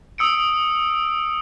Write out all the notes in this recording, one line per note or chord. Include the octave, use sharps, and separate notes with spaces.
D#6 E6 C#7 D7